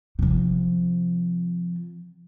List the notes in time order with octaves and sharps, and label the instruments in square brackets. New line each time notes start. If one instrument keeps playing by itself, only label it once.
[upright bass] C3 F3